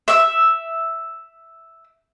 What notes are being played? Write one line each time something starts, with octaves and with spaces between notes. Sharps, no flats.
E5 E6